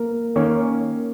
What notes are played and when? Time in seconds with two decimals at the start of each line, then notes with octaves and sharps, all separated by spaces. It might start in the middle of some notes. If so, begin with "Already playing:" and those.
Already playing: A#3 A#4
0.36 D#3 A#3 C#4